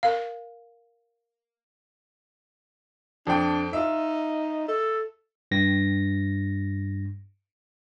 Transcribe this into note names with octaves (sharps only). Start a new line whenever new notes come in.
A#4 F5
F2 D4 G5
D#4 F4 E5
A4
G2 A#6